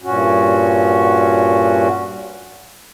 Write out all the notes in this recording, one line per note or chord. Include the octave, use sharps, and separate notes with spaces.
G2 A#2 C#4 F#4